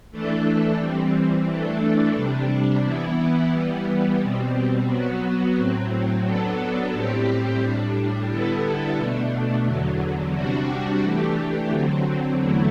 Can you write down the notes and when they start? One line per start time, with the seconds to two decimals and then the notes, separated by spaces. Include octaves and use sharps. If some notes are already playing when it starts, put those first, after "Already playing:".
0.11 E3 A3 D4 A4
0.78 E3 G3 C4
1.47 E3 A3 D4 A4
2.15 C3 G3 D4
2.83 E3 B3 E4
3.51 E3 G3 B3
4.19 B2 G3 C4
4.87 F#3 B3 F#4
5.56 A2 F#3 C4
6.24 F#3 B3 D4 A4
6.92 A2 G3 C4 G4
7.61 A2 G3 D4
8.29 D3 G3 B3 E4 A4
8.96 B2 A3 D4
9.64 E2 D3 F#3
10.33 C3 G3 D4 F#4
11.01 E3 A3 D4 G4
11.69 D3 F#3 C4
12.38 E2 D3 F#3 A3 E4